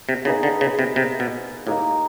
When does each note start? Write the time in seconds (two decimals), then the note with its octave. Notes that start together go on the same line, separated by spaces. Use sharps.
0.09 C3
0.25 C#3 A#3 D#4 G#4 B4
0.43 D3
0.61 C#3
0.79 C3
0.96 C3
1.20 B2
1.67 A2 A#3 D#4 G4